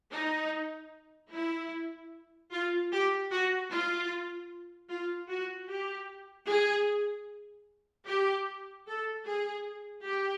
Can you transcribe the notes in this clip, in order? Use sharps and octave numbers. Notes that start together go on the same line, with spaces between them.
D#4
E4
F4
G4
F#4
F4
F4
F#4
G4
G#4
G4
A4
G#4
G4